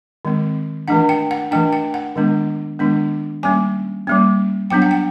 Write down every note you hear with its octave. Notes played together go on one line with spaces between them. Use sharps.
D#3 G#3 C4
E3 A3 D4 F#5
G5
F#5
E3 A3 D4 G5
G5
F#5
D#3 G#3 B3 D4
D#3 G#3 B3 D4
G3 A#3 C#4 G#5
G3 A#3 C#4
F#3 B3 D4 G5
F#5
G5